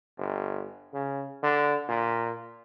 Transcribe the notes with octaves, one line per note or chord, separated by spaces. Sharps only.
G1
C#3
D3
A#2